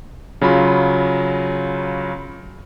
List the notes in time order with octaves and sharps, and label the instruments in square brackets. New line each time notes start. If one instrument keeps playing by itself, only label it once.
[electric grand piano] C#3 F#3 F4 B5